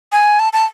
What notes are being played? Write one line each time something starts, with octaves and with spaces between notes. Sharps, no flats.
G#5
A5
A5